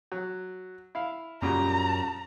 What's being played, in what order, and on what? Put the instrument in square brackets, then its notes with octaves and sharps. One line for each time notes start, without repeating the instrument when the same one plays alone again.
[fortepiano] F#3
E4 F5
[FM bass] F#2 [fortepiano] A#2 C#3 G3 [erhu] A#5